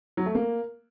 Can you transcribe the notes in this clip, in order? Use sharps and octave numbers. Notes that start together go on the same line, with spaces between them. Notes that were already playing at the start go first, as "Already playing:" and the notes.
F#3
A3
A#3